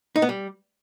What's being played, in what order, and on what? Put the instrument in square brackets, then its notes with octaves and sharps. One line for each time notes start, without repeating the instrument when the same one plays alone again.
[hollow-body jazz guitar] D#4
B3
G3